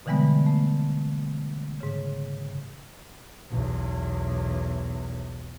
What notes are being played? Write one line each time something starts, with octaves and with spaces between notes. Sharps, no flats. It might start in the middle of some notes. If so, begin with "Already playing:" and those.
B2 D3 E3 G3 G#3 B3
A3
G#2 C#3
B1 E2